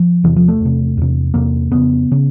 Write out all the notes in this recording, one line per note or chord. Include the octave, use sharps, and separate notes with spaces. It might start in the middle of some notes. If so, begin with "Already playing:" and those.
Already playing: F3
E2 C3 E3
F3
A3
E2 C3
E2 C3
E2 C3 A#3
F2 C#3 B3
C#3